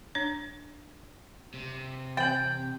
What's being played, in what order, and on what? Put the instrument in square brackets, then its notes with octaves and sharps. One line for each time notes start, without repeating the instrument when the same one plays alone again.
[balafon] D4 C#5
[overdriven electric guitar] C3
[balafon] E3 C4 [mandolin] G5